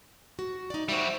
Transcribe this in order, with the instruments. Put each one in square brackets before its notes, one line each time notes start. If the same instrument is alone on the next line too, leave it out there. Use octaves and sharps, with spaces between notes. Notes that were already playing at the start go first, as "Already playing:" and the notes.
[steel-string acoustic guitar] F#4
D#4 D5
[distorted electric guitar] G3 F#4 [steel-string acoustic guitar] C5 D5 E5